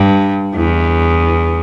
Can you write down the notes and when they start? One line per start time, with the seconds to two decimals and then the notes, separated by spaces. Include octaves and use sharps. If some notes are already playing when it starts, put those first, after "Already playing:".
Already playing: G2
0.55 E2